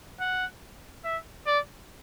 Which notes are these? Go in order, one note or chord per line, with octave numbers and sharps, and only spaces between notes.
F#5
E5
D5